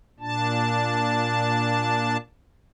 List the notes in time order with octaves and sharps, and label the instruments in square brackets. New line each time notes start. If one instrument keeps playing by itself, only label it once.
[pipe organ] A#2 D4 A5